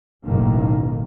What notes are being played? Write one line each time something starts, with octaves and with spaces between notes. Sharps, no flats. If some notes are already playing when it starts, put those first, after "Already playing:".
F#1 B1 F#2 A2 D#3 A#3